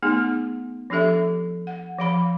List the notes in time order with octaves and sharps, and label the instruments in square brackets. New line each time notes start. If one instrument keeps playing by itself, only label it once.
[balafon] A3 B3 D#4 G#4
F3 D4 G4 A4 E5
F#5
F3 F5 B5